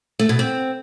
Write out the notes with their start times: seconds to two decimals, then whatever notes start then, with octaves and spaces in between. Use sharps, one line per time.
0.19 A3
0.29 B2
0.39 C4